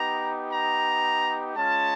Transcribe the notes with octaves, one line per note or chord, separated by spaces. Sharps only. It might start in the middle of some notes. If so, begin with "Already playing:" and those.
Already playing: B3 D#4 G4 A#5
A#5
G#3 C#4 F4 A5